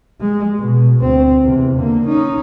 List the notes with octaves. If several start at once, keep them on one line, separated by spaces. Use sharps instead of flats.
G#3
B2
D2 C4
E2 C3
D3 A#3
C#4 D#4